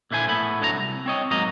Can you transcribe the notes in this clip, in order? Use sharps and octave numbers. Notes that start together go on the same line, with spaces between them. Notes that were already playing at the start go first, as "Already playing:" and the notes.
A#2 D3 E4 C5 G#5
A2 A3 B3 B5
D2 D3 F#3 G4 A#5
C2
C4 C#5 D#5
G#2 F#3 A#3 D#5 A#5